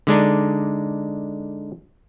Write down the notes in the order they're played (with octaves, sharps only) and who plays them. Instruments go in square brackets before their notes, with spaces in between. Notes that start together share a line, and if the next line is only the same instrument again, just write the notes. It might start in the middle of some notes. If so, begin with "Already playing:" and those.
[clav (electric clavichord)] D3 G#3 D4 D#4